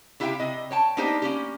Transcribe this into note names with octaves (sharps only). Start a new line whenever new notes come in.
C3 E4 G4 E5 F5 G5
C3 D#5
C#5 G5 A5
A#3 B3 D4 D#4 G4 C5
A#3 C#4 G4